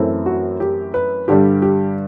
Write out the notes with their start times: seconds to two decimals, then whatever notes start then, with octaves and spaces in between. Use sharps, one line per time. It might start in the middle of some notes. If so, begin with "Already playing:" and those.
Already playing: F#2 E3 A3 C4 E4
0.26 F#4
0.60 G4
0.94 B4
1.28 G2 D3 G3 G4
1.62 G4